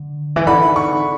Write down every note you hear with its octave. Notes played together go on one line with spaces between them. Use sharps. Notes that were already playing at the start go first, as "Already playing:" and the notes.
Already playing: D3
E3
D3 B5
C#6